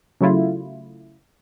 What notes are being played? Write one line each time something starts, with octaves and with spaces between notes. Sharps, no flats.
C#3 F#3 A3 E4 F4